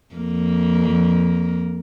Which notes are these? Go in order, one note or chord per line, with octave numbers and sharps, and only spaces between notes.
F2 A#3